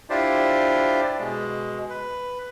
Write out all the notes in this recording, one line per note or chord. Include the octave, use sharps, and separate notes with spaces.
D4 E4 F4 G4 C5 D5
B2 G#3
B4